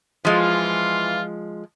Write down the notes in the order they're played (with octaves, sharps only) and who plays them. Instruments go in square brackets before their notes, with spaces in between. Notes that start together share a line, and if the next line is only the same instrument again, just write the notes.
[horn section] E3 F4 [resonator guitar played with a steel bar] F3 G#3